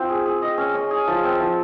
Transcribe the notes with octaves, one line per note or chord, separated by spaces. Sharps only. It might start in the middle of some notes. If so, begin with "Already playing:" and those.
Already playing: C4 F4
G#4
G#4
D#5
C#4
C#4
G#4
F3
C4
F3